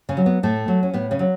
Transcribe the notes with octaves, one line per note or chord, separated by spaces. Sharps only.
C#3 C#4
F#3
B3
A2 A3
F#3
C#4
A2 B3
C#3 C#4
F#3